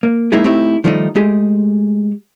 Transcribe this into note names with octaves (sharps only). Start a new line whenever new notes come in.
A#3
G#3 A#3 D#4 E4 G#4
A3 C4 D#4 E4 G4
D#3 F3 G3 A3 C#4 D#4
G#3 A3 G4 G#4